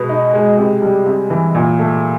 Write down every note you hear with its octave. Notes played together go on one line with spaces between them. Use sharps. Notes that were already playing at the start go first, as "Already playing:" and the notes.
Already playing: B2 G#3 B3
D#4
G#3
C3
G3
C3
E3
A#2
A3